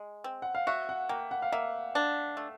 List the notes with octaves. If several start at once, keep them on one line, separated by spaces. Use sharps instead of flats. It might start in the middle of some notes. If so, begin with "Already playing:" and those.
Already playing: G#3
C4
F#5
F5
F#4 E5
F#5
A#3 G5
F#5
F5
A#3 E5
D4
A3